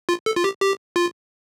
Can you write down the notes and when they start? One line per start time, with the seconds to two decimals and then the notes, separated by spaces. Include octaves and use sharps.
0.09 F4
0.26 A4
0.36 F4
0.44 G4
0.62 G4
0.96 F4